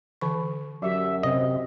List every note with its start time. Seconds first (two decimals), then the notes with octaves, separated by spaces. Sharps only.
0.21 D3 E3 C#6
0.82 F#2 F#3 G4 E5
1.23 C3 D#5